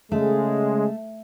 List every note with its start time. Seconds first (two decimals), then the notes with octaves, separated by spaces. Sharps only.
0.12 C#3 G#3 A3